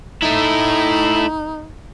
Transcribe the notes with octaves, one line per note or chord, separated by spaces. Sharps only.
A3 D#4 E4